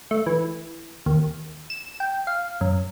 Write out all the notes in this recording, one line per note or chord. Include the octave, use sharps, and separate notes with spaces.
A3
E3
D#2
E7
G5
F5
F#2